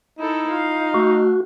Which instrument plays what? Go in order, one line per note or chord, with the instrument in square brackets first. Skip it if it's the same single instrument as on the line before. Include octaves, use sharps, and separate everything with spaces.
[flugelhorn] D#4 [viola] E4 A4
[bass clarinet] F4 [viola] F5
[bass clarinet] A3 [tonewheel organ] F#4